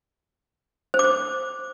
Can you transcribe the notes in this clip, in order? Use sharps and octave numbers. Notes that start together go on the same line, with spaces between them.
C5
D6
C5